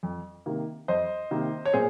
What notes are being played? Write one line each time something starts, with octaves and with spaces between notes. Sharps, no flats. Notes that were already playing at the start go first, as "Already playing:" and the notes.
F2
C3 D#3 A#3
F2 C5 D#5
C3 D#3 A#3
C#5
A#2 G#4 C5